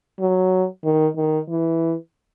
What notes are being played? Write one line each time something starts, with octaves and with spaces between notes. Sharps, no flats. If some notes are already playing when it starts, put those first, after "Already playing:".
F#3
D#3
D#3
E3